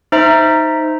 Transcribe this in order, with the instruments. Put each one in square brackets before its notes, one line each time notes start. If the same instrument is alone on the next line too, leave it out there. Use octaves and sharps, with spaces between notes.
[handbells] D#4 C5 E5 A#5